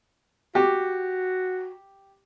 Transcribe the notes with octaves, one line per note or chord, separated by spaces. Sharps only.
F#4 G4